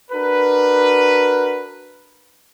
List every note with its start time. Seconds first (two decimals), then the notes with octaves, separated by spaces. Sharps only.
0.11 D4 F#4 A#4 B4